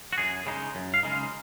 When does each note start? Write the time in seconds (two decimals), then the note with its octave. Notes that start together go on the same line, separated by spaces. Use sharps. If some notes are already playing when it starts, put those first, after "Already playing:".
0.13 F#4
0.18 F#2 G#4
0.46 C#3 G#3 D#4
0.75 F#2
0.94 F5
1.03 C#3 G#3 D#4
1.11 F5